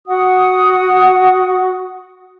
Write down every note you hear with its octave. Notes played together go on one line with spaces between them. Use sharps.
F#4 F#5 D#6